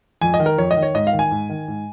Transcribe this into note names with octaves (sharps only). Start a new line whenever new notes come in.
F2 G#5
D#5
D#3
A#4
F2 C#5
D#5
D#3
C#5
G#2 D#5
F5
D#3
G#5
G#2
D#3
G#2